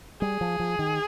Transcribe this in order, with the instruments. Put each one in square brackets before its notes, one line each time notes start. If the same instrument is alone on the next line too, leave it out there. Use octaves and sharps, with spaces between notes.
[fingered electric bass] G3 [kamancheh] G#4
[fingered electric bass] F3
F3
D#3